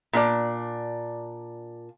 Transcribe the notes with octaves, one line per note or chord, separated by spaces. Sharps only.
A#2 D4 D5